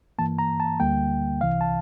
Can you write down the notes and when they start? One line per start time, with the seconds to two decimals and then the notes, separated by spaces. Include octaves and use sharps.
0.18 G2 E3 A#3 A5
0.39 A#5
0.60 A5
0.80 D2 D3 G3 A#3 G5
1.41 C2 C3 E3 F5
1.61 A5